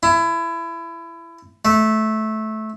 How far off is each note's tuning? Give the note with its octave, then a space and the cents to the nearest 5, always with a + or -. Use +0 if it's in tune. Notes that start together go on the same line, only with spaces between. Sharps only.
E4 +25
A3 -15